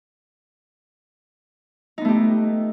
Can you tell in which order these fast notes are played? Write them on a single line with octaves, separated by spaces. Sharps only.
D#4 B3 A3 G4